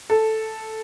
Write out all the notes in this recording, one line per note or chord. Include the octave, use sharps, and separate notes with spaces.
A4